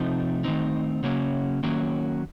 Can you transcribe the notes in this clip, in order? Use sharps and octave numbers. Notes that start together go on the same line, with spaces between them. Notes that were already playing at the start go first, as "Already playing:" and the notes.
Already playing: C3 F3 A3 C4 D#4
D#3 A3 C4 D#4
C#3 F#3 A#3 C#4
D#3 F#3 A#3 C#4